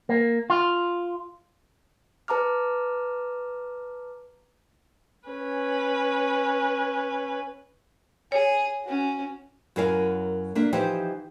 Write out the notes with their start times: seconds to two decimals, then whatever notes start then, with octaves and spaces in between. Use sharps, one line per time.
0.09 A#3
0.50 F4
2.28 B4 A5 A#5 D6 F6
5.28 C#4 B4
8.32 G#4 C#5
8.84 C#4 F#4
9.76 F#2 F#3 E4 A#4 F5 G#5
10.55 A#3 D4 E5
10.73 E3 F3 D#4 G4 C5